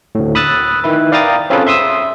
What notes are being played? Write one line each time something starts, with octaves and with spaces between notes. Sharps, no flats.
D2 A2
B5 D#6 E6 F#6 A6
D#3 E4 B4
D5 F5 G5 A#5 D#6 A6
C4 C#4 F4 G#4 A4 B4
E5 C6 D#6 E6